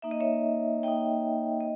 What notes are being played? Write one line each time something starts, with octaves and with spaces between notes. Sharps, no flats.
A#3 D#4 E5
D#5
C#5 E5
A#3 D#4 D#5 G5
D#5